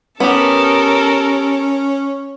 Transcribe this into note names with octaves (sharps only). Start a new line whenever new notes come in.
B3 C#4 G4 A4 A#4